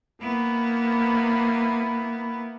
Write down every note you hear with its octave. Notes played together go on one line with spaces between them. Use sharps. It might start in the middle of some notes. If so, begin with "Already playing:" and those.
A#3 B3 E4